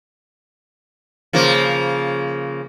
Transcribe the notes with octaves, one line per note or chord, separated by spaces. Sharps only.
C#3 F3 A#3